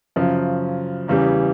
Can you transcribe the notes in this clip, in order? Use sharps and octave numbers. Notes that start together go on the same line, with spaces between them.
F#2 C#3 F3
E2 C#3 E3 G3